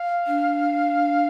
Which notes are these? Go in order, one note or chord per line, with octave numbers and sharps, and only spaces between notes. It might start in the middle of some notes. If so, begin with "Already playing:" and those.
Already playing: F5
D4